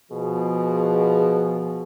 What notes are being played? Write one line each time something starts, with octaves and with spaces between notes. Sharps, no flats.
B2 F3 G#4